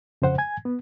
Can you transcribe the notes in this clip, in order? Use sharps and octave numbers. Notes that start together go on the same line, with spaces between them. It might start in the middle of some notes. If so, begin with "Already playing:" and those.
F2 C#3 C5 F#5
G#5 G#6
B3